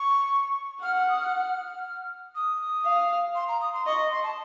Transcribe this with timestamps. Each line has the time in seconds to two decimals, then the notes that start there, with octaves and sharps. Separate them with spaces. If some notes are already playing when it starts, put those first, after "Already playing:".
Already playing: C#6
0.83 F#5 F6
0.96 F6
1.09 D#6
1.20 F6
2.35 D#6
2.85 F5
3.35 C6
3.48 A#5
3.61 D#6
3.74 C6
3.86 D#5 C#6
4.11 C6
4.23 A5